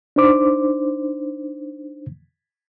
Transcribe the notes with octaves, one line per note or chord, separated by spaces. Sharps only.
D4 D#4 C5 D6